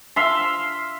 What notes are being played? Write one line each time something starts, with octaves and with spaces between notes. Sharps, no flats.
E5 F5 C6